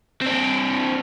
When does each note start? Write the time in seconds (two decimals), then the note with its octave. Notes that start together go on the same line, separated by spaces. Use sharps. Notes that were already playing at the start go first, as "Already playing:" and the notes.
0.22 C4 D4